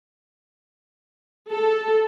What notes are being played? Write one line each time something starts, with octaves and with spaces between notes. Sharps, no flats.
A4